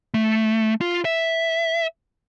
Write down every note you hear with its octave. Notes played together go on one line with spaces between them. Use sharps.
A3
F4
E5